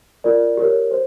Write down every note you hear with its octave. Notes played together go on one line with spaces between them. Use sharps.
F4 A#4 D5
G4 A#4 C#5
C5